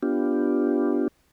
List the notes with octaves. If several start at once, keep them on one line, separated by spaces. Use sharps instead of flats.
B3 D4 F4 G4